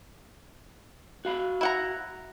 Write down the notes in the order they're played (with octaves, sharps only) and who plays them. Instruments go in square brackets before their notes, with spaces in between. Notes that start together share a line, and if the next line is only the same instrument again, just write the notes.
[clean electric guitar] F#4 F5 B5
[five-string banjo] E4 F#5 A#5